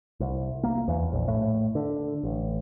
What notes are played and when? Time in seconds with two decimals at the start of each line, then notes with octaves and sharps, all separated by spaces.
0.20 C2
0.63 A#3
0.88 E2
1.13 A#1
1.28 A2
1.75 D3
2.23 A1